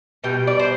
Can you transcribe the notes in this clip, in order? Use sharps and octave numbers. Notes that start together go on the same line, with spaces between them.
B2 G3 G5
D5
C5